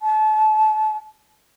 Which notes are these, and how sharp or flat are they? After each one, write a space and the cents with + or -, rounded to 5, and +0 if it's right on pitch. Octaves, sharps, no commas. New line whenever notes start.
A5 -35